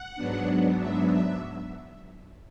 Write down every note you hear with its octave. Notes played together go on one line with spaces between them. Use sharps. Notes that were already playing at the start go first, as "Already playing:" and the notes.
Already playing: F#5
G#2 F#3 B3 D4
E5
E5